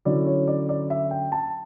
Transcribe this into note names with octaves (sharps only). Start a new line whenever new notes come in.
D3 F#3 C#4 E4 D5
C#5
D5
D5
E5
G5
A5